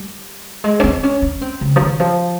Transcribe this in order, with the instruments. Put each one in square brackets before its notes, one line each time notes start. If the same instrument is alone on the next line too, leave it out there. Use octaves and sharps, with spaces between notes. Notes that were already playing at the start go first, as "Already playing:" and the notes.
Already playing: [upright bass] G3
G#3
C#4
C4
C#4
C#4
C4
C#3
F3
D#3
F3